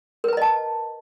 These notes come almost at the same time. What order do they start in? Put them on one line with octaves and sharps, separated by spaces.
A#4 B4 A#5 D#5 A5